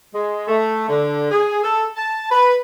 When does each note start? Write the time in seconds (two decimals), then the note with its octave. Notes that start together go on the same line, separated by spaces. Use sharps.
0.14 G#3
0.48 A3
0.89 D3
1.31 G#4
1.64 A4
1.96 A5
2.30 B4